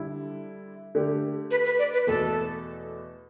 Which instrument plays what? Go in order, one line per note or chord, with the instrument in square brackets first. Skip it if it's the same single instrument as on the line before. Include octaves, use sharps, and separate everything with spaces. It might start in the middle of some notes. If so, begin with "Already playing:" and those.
Already playing: [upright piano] D3 G3 E4
D3 A3 G4
[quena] B4
B4
D5
B4
[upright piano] E2 B2 A3 [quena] A4